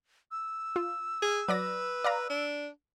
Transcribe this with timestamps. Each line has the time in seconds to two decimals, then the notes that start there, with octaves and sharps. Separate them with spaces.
0.31 E6
0.76 F4
1.22 G#4
1.48 F#3 B4 D5 A#6
2.04 D5 F5 A#5
2.30 D4